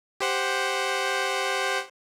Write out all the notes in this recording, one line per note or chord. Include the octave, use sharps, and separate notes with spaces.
G4 C5 F#5